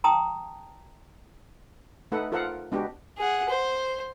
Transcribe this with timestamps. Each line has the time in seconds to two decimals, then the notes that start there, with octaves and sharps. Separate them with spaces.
0.04 G5 A5 A#5 C6 D#6
2.12 A3 D#4 A4 B4 F#5
2.32 F4 A4 A#4 C5 F5 F#5
2.72 G#3 B3 D4 F#4 G4
3.18 G#4 F#5
3.49 C5